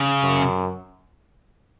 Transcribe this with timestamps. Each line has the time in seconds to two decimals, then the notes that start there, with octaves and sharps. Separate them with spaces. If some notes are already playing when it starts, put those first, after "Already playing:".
Already playing: C#3
0.23 F#2